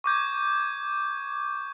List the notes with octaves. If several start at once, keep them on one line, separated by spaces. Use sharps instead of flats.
C#6 D6 G6 G#6